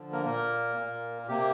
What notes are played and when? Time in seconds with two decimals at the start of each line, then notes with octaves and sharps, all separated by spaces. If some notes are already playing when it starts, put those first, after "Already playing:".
Already playing: D3 F3
0.13 A#3 A#4
0.25 A#2 A#3 A#4
0.77 A#2 A#3
1.28 C3 A#3 G4